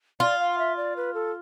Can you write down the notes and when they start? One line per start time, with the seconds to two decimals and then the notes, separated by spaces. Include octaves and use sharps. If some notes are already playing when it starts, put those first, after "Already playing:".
0.20 F4 D5
0.39 F5
0.58 E5
0.77 D5
0.96 B4
1.14 A4